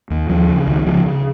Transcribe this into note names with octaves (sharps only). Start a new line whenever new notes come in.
D#2
D#2 F3
C#3
C#2 D#3
C#3 F3
C#3